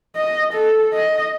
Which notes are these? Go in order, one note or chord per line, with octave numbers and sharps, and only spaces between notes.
D#5
A4
D#5